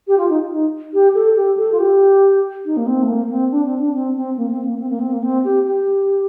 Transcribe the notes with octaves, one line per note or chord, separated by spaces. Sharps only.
G4
F4
D#4
D#4
G4
A4
G4
A4
F4
G4
D#4
A#3
C4
A3
A#3
C4
D4
C4
D4
C4
C4
A#3
C4
A#3
C4
A#3
C4
A#3
C4
G4
G4